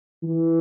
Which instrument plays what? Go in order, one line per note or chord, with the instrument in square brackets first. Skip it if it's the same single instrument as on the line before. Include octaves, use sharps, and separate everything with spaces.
[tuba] E3